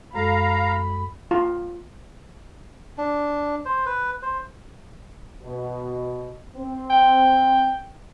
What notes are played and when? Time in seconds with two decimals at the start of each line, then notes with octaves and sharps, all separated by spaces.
0.15 F#2 G#3 A4 F5 A#5 B5
1.31 F4
2.98 D4
3.65 C5
3.86 B4
4.22 C5
5.43 B2
6.57 C4
6.90 G5